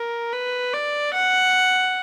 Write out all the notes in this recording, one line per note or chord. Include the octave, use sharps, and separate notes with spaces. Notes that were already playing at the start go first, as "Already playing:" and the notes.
Already playing: A#4
B4
D5
F#5